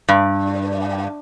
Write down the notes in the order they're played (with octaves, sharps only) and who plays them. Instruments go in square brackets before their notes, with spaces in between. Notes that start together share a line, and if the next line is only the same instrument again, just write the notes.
[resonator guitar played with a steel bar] G2